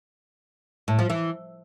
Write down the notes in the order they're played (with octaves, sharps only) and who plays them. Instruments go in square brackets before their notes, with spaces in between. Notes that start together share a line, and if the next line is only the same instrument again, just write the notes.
[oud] A2
F3
E3